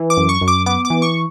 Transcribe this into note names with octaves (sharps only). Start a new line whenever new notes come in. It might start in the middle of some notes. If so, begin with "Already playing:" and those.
Already playing: E3
D6
F#2
C#6
F#2
D6
B3 D6
D6
E3
C#6